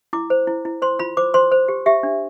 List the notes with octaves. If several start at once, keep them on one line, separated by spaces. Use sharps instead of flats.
E4 D6
C5
E4
E4
C5 C6
F4 B5
C5 D6
C5 C6
C5
G4
G4 E5
D4